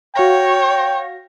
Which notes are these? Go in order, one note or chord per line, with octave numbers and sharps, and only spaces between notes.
F#4 C#5 F5 G5 A#6